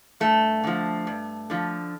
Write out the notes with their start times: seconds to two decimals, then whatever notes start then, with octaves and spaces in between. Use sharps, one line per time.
0.20 G2 A3
0.64 D3 F3
1.07 G2
1.50 D3 F3